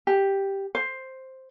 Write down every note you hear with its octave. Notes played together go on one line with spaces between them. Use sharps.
G4
C5